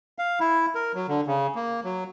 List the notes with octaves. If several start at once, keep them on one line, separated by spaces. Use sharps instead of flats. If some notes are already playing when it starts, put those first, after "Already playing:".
F5
E4
A#4
F#3
D3
C#3
A#3
F#3